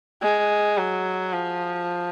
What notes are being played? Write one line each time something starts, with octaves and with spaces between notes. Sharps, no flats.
G#3
F#3
F3